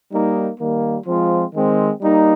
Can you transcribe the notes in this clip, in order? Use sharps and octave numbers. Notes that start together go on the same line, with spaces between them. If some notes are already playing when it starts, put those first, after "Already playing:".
G3 A#3 D#4
D#3 G3 A#3
F3 G#3 C4 F4
D#3 G#3 C4
G3 A#3 D#4